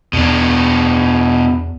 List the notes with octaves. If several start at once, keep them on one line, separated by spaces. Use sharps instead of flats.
E2 B2 D4